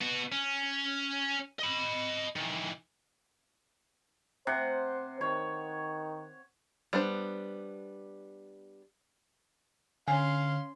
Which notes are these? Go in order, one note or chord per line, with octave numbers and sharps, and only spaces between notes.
B3 F#4
C#4
D#5 B5
D#3 E3
C3 C5 F#5
D#3 C#5
G3 B3 D4 C5
D3 C#4 F5 G#5 C6